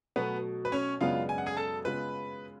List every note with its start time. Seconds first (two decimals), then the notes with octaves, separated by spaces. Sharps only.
0.16 B2 F#3 A3 B3 B4
0.65 B4
0.72 C#4 C#5
1.01 F#2 C#3 G#3 B3 D4 F4 F5
1.29 G#5
1.38 F#5
1.46 G#4 G#5
1.57 A4 A5
1.85 C#3 G#3 B3 F4 B4 B5